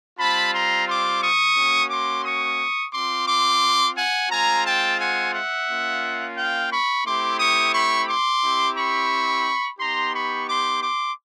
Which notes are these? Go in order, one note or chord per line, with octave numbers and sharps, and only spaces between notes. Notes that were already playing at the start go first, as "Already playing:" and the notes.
G3 C4 F4 A5 B5
A#5 C6
C6 D6
C#6 D#6
A#3 C#4 F#4
C6 D6
C#6 D#6
C4 F4 C6 D6
C6 D6
F#5 G#5
G#3 C4 F4 G#5 A#5
G5 A5
F#5 G#5
E5 F#5
A#3 C#4 F4
F5 G5
B5 C#6
A3 C4 E4 G4 C6 D6
C#6 D#6
B5 C#6
C6 D6
C4 E4 G4
B5 C#6
B3 D#4 G4 A#5 C6
B5 C#6
C6 D6
C6 D6